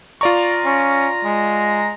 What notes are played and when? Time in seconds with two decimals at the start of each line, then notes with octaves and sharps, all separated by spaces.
0.21 F4 D5 A#5 C#6
0.65 C#4
1.24 G#3